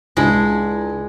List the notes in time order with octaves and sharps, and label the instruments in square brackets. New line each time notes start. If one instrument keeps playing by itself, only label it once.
[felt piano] C#2 [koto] G#3 [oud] D4 E4